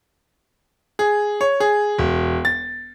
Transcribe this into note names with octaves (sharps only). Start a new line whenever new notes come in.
G#4
C#5
G#4
E1
A6